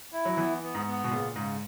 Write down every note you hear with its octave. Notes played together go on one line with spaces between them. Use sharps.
E4
F#3
E3 B3
B3
G#2
B3
B2
A#2 C#3
G#2 C#3